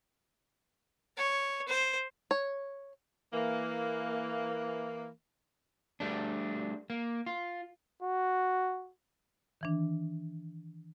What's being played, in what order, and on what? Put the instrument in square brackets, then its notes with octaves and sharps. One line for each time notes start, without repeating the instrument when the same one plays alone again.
[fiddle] C#5
C5
[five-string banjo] C#5
[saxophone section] E3 A#3
[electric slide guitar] G3 A3 D4
A#3
F4
[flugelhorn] F#4
[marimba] D#3 E3 D4